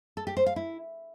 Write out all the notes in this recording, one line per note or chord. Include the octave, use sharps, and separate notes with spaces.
A4
G4
C5
F5
E4